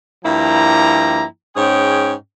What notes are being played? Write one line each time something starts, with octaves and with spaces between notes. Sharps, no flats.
G2 F3 A#3 E4 G5 A#5
G#2 C#4 G#4 C#5 G5